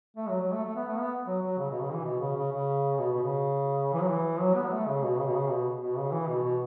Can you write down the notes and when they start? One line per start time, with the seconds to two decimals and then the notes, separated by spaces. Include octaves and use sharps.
0.17 A3
0.29 F#3
0.41 F#3
0.52 A3
0.65 A3
0.76 B3
0.88 A3
1.00 B3
1.27 F#3
1.42 F#3
1.58 C#3
1.70 B2
1.82 C#3
1.94 E3
2.05 B2
2.20 C#3
2.36 C#3
2.52 C#3
2.99 B2
3.13 B2
3.23 C#3
3.94 E3
4.01 F#3
4.09 E3
4.41 F#3
4.56 B3
4.66 F#3
4.72 A3
4.87 C#3
5.03 B2
5.19 C#3
5.28 B2
5.34 C#3
5.50 B2
5.81 B2
5.97 C#3
6.12 E3
6.28 B2
6.44 B2